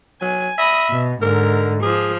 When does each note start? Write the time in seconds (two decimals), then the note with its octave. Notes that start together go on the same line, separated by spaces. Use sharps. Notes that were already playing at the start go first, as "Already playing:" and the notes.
0.21 F#3 G#5
0.58 E5 B5 D#6 A#6
0.90 B2
1.22 G#2 D3 A#4
1.82 F3 G#4